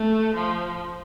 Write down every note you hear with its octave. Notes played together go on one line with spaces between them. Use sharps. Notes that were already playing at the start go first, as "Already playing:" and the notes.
Already playing: A3
F3